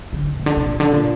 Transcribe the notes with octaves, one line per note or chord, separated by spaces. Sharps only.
D3
A#2
D3
C3
A#2
D3
A#2